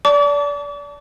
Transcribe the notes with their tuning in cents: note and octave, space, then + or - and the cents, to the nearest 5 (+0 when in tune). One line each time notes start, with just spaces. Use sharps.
D5 -30 A5 +0 D6 -40